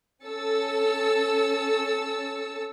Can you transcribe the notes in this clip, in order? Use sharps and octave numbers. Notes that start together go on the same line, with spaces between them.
C#4 A4 E6 A6 C#7